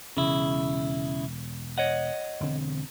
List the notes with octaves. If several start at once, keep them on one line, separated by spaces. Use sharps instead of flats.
E1 C#3 E4
C#5 D#5 F#5
E1 D3 C4